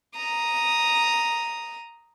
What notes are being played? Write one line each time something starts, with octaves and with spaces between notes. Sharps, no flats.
A#5 D#6